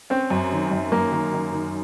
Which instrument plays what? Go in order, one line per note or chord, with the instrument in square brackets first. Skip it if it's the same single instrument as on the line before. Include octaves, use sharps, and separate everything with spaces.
[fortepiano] C4 [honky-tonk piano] C#4
[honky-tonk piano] F#2
D#3
F#2
[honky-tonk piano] F#2 [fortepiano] A#3
[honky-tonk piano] D#3
D#3
D#3